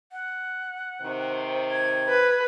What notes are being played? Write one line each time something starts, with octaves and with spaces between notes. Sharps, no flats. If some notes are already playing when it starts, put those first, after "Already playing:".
F#5
C3 D#3 C5
G#6
B4